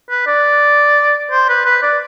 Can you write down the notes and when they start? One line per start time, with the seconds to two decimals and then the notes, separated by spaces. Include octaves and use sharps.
0.10 B4
0.27 D5
1.31 C5
1.49 B4
1.65 B4
1.83 D5